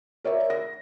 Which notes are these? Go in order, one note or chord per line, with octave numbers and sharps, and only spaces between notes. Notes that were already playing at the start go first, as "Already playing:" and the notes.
A#4 C#5 D5 E5
A#6